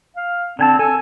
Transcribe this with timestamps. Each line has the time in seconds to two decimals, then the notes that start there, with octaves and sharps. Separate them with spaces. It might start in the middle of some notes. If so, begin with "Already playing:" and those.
0.17 F5
0.59 D3 C4 G#5 A5
0.79 A4 G#5